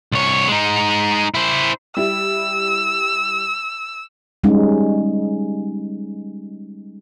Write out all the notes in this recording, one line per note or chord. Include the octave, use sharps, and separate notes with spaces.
C2 C#5
G#3 D#4
E4 C5
G3 E4 E6
G3 G#3 C#4 D#4